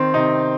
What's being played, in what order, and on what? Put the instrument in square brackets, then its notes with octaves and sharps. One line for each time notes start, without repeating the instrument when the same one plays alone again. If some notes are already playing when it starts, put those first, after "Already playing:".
Already playing: [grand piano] D#3 C4
C3 D#4